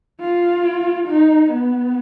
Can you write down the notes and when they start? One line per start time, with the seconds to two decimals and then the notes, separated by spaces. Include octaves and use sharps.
0.20 F4
1.07 D#4
1.50 B3